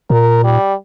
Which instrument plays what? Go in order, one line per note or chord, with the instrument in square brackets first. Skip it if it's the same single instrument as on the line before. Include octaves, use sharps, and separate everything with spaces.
[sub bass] A#2 [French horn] A#4
[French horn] G3